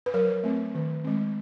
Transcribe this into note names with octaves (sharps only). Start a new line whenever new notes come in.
B4
F#3 A#4
A3 C4
D#3
G#3 C4